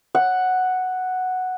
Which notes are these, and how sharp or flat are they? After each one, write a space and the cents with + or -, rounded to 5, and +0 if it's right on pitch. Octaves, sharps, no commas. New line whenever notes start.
F#5 +0